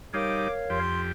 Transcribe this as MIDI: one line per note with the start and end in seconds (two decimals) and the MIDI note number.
0.14 0.48 55
0.14 0.48 63
0.14 0.79 70
0.14 0.79 73
0.14 0.79 77
0.14 0.51 86
0.70 1.12 41
0.70 1.12 67
0.70 1.01 84